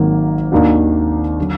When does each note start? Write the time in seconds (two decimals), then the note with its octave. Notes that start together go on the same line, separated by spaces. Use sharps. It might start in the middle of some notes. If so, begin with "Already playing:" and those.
Already playing: G#1 G#2 D#3 F#3 A#3
0.52 D#2 D#3 A#3 D4 F#4
1.39 D3 F#3